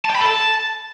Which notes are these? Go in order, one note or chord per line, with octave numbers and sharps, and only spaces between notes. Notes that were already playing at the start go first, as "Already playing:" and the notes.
A5
G5
B5
A4
A5